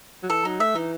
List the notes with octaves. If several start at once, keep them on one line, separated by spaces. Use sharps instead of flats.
F#3
E3 A4
F#3 D#4
A3 E5
E3 D#4